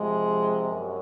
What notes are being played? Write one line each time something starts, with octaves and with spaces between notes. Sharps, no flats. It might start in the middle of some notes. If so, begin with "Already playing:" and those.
Already playing: C3 F3 G#3
F#2